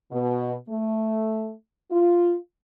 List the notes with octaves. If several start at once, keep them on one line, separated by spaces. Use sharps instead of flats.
B2
A3
F4